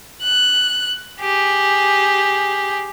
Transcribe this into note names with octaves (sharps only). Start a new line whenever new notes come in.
F#6
G4 G#4